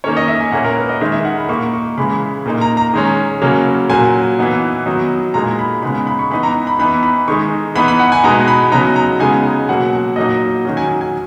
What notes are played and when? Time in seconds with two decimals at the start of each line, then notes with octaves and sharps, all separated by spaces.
0.04 D#3 A#3 C#4 C#5
0.17 D#5
0.28 E5
0.40 G#5
0.52 A#2 A#3 C#4 F#5
0.65 A#4
0.77 B4
0.89 D#5
1.01 D#3 G#3 D#4 E5
1.12 E5
1.25 F#5
1.37 B5
1.49 A#2 A#3 D#4 C#6
1.73 C#6
1.97 C#3 E3 G#3 B5
2.46 A#2 A#3 D#4
2.61 A#5
2.77 A#5
2.94 D#3 G#3 C#4
3.42 C#3 F#3 A#3 C#4
3.89 A#2 F#3 A#3 G#5
4.39 E3 B3 D#4
4.86 D#3 F#3 B3 D#4
5.34 A#2 G#3 D#4 A#5
5.59 B5
5.82 C#3 G#3 B3 D#4 B5
6.07 B5
6.19 C#6
6.31 E3 B3 D#4 B5
6.43 A#5
6.67 B5
6.79 E3 B3 D#4 B5
7.03 B5
7.28 D#3 G#3 D#4 C#6
7.75 E3 B3 D#4 B5
7.88 B5
7.99 F#5
8.12 G#5
8.23 B2 G#3 B3 D#4 A#5
8.48 B5
8.72 C#3 F#3 B3 D#4 A#5
8.96 A#5
9.20 C#3 G#3 B3 D#4 G#5
9.69 B2 F#3 A#3 F#5
9.93 F#5
10.16 A#2 F#3 A#3 D#4 D#5
10.65 D#3 F#3 C#4
10.77 G#5
10.89 G#5
11.01 G#5